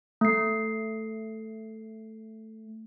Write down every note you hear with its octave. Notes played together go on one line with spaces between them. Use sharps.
A3 C7